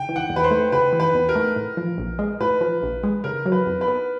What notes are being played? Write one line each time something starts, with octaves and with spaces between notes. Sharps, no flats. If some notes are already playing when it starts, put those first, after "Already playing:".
Already playing: C#3 G5
E3
F#5
E2
B4
C5
A3
C#3 B4
E3
B4
E2
A#4
A3
A2
F3
A#1
G#3
A2 B4
F3
A#1
G#3
C#3 A#4
F#3
B4
F2
B4
B3